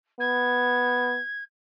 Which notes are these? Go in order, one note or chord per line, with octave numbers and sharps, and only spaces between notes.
B3 G#6